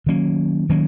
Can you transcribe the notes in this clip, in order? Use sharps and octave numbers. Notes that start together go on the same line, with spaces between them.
D#3 F#3 A#3 C#4
D#3 F#3 A#3 C#4